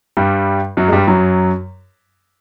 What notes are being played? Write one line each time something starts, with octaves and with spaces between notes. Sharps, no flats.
G2 G3
F#2 F#3
G#3
G2 G3
F#2 F#3